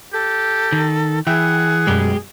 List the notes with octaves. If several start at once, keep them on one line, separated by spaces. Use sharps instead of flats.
G4 A4
D#3
E3 G#4 E5 F#5 G5
F#2 B2 G3 G#3 G4